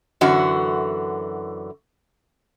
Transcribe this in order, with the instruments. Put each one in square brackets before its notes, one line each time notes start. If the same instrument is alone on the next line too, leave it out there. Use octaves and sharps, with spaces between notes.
[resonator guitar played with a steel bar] F#2 D3 E3 F#4